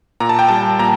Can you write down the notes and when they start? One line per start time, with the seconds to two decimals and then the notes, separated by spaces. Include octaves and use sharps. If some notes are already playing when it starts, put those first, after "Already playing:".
0.20 A#2 A#5
0.29 A5
0.39 G5
0.48 G3 A5
0.79 A#2 A#5